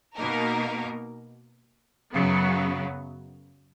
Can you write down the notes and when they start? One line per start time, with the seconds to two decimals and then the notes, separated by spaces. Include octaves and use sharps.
0.15 B2 A#3 D#4 A#4
2.14 F#2 C#3 F#3 B3